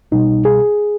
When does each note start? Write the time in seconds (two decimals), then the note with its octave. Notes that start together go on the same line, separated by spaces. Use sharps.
0.12 C2 B2 G3 D#4
0.45 G#4